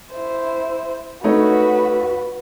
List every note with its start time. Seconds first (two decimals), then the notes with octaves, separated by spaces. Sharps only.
0.13 E4 C5
1.24 A3 D#4 F#4 B4 C#5